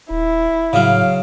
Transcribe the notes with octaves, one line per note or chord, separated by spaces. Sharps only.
D#1 E4
A2 C#3 F#3 F5